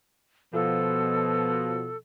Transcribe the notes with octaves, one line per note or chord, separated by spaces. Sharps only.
B2 F3 A4